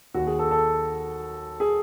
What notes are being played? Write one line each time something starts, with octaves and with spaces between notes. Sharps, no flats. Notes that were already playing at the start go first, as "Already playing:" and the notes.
D#2 D#3 F#4
G#4
A4
A4
G#4